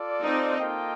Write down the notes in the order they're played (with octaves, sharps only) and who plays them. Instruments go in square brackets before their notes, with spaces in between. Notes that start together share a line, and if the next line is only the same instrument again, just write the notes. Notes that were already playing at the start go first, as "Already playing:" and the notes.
Already playing: [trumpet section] F4 A4 D5
[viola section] C4 D#4
[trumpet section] A#3 F4 A4 D#5 G5